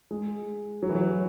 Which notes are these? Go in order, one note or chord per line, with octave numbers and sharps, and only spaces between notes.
G#3
F#3
E3
F#3